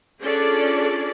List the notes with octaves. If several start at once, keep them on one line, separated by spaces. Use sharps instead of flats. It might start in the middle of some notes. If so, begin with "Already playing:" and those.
C#4 D4 F4 G#4 A4 D5